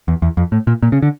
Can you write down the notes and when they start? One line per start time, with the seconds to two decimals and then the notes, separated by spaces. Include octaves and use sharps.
0.08 E2
0.22 E2
0.37 F2
0.52 A2
0.67 A#2
0.83 A#2
0.92 C#3
1.03 D3